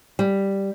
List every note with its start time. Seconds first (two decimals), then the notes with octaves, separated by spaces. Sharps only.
0.19 G3